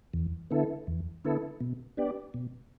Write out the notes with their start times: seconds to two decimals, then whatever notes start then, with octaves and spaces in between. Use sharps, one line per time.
0.14 E2
0.51 D3 B3 E4 A4
0.87 E2
1.25 D3 B3 E4 A4
1.61 B2
1.97 B3 D4 G4 D5
2.34 B2